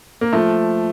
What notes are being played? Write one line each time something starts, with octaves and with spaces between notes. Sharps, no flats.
A#3
F3 A3